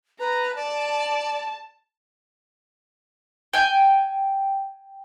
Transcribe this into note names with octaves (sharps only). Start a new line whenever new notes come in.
B4 A#5
D5 A5
G5 G#5